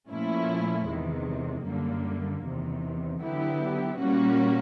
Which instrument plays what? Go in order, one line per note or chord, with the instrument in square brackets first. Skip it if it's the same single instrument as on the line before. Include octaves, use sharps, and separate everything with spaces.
[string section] A#2 F3 A3 C#4 E4
E2 C3 D#3 G#3
F#2 D3 G3 A#3
E2 C3 D#3
D3 F#3 B3 E4 G4
A#2 G3 A#3 C#4 F#4